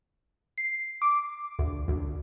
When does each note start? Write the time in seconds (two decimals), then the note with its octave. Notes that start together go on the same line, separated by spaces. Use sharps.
0.58 C7
1.02 D6
1.59 D2
1.88 D2